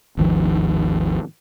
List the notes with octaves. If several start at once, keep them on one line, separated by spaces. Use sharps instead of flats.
G#1 D#2 D#3 F3